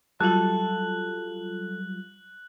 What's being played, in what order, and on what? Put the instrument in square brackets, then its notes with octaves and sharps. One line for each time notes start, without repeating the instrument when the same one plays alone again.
[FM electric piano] F#3 G3 F4 [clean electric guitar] A4 A5 [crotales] F#6 F#7